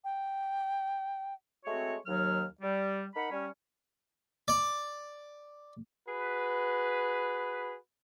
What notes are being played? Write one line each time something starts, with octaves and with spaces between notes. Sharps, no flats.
G5
G#3 A3 C4 F#4 C#5
D#2 F#3 F6
G3
D#4 A#4 F#5 B5
G3 C#4
D5
F#4 G#4 B4